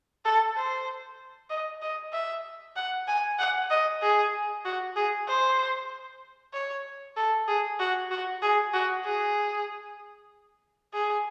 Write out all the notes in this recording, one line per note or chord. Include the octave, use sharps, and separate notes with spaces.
A4
C5
D#5
D#5
E5
F#5
G#5
F#5
D#5
G#4
F#4
G#4
C5
C#5
A4
G#4
F#4
F#4
G#4
F#4
G#4
G#4